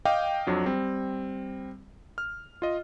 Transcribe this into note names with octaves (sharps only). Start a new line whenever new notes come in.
D#5 F5 G5 D6
F2 F#3 D4
G3 C4
F6
F4 D#5